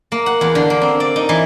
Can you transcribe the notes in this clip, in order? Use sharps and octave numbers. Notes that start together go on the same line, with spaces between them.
A#3
F#5
E2
D3
A#3
C4
D5
D#4
E3